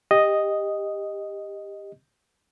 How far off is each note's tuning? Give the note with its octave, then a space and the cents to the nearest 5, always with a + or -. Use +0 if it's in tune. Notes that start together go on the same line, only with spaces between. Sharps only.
G4 +20 D#5 +0